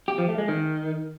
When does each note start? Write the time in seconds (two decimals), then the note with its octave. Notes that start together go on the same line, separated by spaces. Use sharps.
0.08 G4
0.18 F3
0.28 A3
0.38 G#3
0.48 D#3